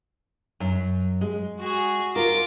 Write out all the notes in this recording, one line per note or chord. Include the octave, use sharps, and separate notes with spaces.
F#2
G#3
F#4 G#4
F4 A#4 D6